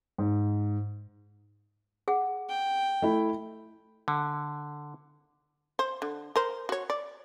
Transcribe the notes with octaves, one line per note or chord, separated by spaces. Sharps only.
G#2
G#4 F#5
G5
A3 E4
D3
C5
D3
A#4 C5
F#4 C#5
D5